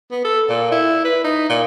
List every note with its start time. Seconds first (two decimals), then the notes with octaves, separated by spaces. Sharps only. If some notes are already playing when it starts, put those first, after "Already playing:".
0.11 B3
0.24 A4
0.49 A#2
0.71 E4
1.05 B4
1.24 D#4
1.49 A#2